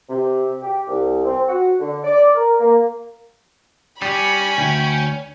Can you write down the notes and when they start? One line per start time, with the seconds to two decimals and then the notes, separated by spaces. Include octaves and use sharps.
0.09 C3
0.62 G4
0.88 C2
1.25 C4
1.48 F#4
1.79 D3
2.04 D5
2.35 A#4
2.60 A#3
4.02 G3 C#4 G#5 B5
4.58 D2 G5